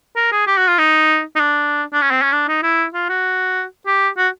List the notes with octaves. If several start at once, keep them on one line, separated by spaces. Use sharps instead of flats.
A#4
G#4
G4
F#4
F4
D#4
D#4
D4
D4
C#4
C4
C#4
D4
D#4
E4
F4
F#4
G4
F#4